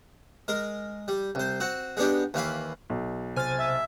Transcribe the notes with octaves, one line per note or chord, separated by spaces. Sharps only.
G#3 A#4
G3
C2 C5
C4 F#4
G#3 B3 D4 G4
D#2 E3 F5 B5
B1
C3 C5 G#5 F6 A6
E5